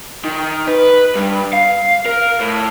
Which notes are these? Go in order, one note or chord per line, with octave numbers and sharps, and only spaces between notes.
D#3
B4
G2
F5
A#4
A2